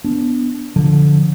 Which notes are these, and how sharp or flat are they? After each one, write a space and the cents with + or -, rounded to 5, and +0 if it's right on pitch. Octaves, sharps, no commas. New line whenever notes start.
B3 +0 D4 -10
D3 -10 F3 +0